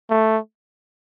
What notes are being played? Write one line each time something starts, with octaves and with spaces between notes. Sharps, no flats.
A3